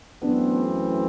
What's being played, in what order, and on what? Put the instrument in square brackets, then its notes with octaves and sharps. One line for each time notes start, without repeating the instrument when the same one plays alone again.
[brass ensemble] F#2 E3 A3 C4 [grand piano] B3 D4